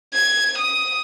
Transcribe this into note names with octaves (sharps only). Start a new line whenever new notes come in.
G#6
D#6